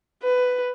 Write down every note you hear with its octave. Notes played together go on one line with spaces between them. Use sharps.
B4